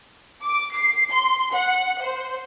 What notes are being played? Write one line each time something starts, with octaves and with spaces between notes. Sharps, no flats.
D6
C7
C6
F#5
C5